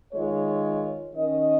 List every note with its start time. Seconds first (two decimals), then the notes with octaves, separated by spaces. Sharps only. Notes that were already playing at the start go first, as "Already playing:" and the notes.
0.13 D#3 G#3 F4 C#5
1.15 D#3 C#4 A#4 D#5